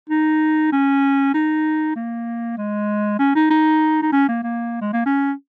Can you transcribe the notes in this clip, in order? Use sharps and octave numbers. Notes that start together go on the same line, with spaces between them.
D#4
C#4
D#4
A#3
G#3
C#4
D#4
D#4
D#4
C#4
A#3
A#3
G#3
A#3
C#4